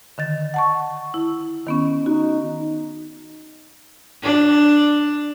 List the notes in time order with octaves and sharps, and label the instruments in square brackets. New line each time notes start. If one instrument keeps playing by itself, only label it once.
[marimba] D3 D#3 A6
F#5 A5 C#6
E4
D#3 B3 C#4
[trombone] D#4 [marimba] F#4
[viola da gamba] D4